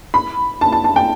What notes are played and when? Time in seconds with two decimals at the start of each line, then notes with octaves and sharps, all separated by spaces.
0.14 B5
0.61 A5
0.72 A5
0.84 A5
0.96 G5